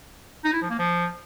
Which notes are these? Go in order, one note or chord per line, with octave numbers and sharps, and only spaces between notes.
D#4
E4
F3
A#3
F3